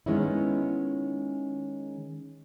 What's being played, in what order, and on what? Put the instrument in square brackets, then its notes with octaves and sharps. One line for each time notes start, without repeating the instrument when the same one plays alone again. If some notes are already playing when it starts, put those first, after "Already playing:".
[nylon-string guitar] D#3 G#3 B3 C#4 D#4 E4